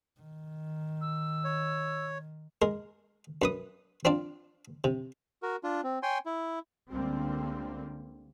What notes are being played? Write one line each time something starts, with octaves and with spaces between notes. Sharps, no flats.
D#3
E6
C#5
G#3 A#4
F#2 B4 D#6
C4 D4 F4 D5
C3
F#4 A#4
D4 F4
C4
C#5 G5 G#5 C6
E4
C#2 D3 G3 A#3 C4